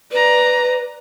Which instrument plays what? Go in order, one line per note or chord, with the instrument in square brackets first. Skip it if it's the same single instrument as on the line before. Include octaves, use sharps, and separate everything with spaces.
[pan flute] B4 [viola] D5 A#5